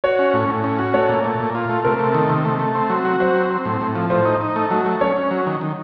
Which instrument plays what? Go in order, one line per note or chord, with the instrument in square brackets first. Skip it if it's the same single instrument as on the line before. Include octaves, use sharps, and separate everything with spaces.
[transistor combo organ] F#4 [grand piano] C#5
[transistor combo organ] C#4
A2
A2
C#4
F#4
[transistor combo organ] A3 [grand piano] C#5
[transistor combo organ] A#2
A3
A#2
F4
A3
[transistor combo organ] C3 [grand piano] A#4
[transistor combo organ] A3
D#3
C3
A3
A3
C4
F#3
F#4
[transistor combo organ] F#3 [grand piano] C5
[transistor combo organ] C4
C4
A2
A2
F3
[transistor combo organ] A2 [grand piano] C5
[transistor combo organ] D#4
D#4
A3
F#3
A3
[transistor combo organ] C#4 [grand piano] C#5
[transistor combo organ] C#4
F#3
D#3
D#3